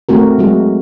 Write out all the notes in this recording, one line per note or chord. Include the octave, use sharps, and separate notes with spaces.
A3 C4 F#4 A#4
F#3 G#3 F#4